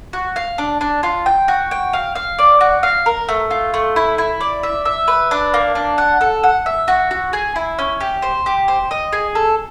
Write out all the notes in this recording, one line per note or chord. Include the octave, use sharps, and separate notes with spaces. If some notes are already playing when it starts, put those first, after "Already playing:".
F#4
F5
D4
D4
F4
G5
F#4
G5
F5
F5
D5
F#4
F5
A#4
A3
F4
A3
E4
E4
D5
E5
E5
B4
D4
A#3
D4
F#5
A4
F#5
E5
F#4
F#4
G#4
E4
C#4
G4
C5
G4
C5
D#5
G#4
A4